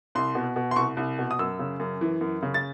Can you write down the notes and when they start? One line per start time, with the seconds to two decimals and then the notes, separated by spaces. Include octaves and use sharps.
0.15 C2 C6
0.35 B2
0.56 B2
0.71 C6
0.76 C2 C#6
0.97 C2
1.19 B2
1.31 D#6
1.39 F#2 E6
1.59 C#3
1.80 F#2
2.01 E3
2.21 F#2
2.43 C#3
2.54 A6